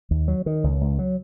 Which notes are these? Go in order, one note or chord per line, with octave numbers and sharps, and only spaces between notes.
D#2
F#3
D#3
C#2
C#2
F#3